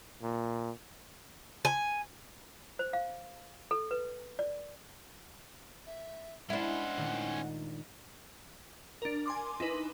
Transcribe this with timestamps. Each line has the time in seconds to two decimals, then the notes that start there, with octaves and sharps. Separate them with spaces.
0.23 A#2
1.65 G#5
2.79 C5
2.93 F5
3.71 A4
3.91 B4
4.39 D5
5.87 E5
6.50 G#3 C#4 D4 E4 C5 F#5
6.97 A#2 D#3 A3
9.02 D4 A#4
9.26 G#5 C6 D6
9.60 D#4 E4 B4